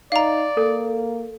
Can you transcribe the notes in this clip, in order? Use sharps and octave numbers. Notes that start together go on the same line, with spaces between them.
D#4 D5 F5 A#5
A#3 A4